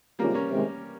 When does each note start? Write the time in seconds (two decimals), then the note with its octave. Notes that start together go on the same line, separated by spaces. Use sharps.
0.19 C3 D#3 G3 G#3 A#3 C#4 F4
0.34 A#3 C#4
0.51 C3 D#3 G#3